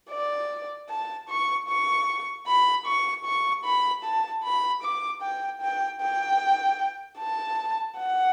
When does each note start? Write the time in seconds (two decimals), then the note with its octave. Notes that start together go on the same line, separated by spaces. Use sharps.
0.10 D5
0.89 A5
1.29 C#6
1.68 C#6
2.46 B5
2.86 C#6
3.25 C#6
3.64 B5
4.04 A5
4.43 B5
4.83 D6
5.22 G5
5.61 G5
6.01 G5
7.19 A5
7.97 F#5